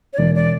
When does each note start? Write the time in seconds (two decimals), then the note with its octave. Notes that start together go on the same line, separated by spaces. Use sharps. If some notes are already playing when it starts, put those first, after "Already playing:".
0.13 C#5
0.18 E1 D5
0.35 D5